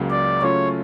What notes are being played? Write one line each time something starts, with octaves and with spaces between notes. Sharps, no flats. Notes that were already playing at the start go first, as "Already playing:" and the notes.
Already playing: C#2 C#3 F#3 A#3
D5
C#3 F#3 A3 C#4 F4 C#5